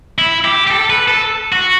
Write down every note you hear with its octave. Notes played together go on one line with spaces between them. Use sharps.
E4
G4
G4
A4
B4
A4
F#4